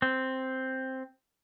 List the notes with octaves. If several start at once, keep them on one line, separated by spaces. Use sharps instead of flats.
C4